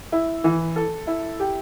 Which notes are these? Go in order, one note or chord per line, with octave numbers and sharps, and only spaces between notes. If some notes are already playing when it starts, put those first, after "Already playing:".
E4
E3
A4
E4
G4